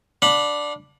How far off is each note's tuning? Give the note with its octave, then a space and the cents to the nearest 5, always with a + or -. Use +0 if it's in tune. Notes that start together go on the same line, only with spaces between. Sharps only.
D4 +0 F5 +45 B5 +0